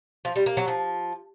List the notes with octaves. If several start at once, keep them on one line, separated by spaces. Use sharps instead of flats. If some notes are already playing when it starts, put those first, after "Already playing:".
F3
G3
A#3
F#3
F3